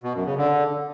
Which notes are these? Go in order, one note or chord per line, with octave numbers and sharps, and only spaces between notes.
B2
F#2
C#3
D3